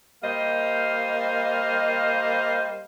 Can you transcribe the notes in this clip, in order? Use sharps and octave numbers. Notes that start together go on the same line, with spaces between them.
G3 A#3 C5 D#5 F5